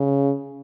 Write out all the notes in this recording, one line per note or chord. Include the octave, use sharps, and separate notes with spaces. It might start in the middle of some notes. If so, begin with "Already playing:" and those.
Already playing: C#3